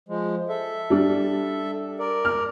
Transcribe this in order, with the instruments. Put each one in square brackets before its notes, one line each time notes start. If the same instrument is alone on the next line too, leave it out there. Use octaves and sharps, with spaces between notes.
[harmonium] F3 G#3
A4 E5
[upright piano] G3 D4
[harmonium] A#4 D5
[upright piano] F6